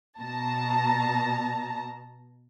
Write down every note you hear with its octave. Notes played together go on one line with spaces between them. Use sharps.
B2 A5 A#5